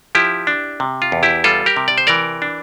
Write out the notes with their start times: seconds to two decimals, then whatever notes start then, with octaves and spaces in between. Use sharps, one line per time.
0.15 F3 E4 G4
0.47 D4
0.80 C3
1.02 F4
1.12 E2
1.23 E4 G4
1.44 G3 F4 A4
1.66 G4 A#4
1.77 C3
1.88 D5
1.98 C5
2.07 E3 A#4 D5
2.42 D4